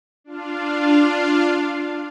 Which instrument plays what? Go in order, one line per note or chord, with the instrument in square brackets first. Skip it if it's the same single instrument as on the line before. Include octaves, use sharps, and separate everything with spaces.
[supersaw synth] D4 F4 F5